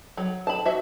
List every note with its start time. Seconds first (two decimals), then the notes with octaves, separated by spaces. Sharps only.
0.17 F#3
0.47 A5 B5
0.65 F#4 E5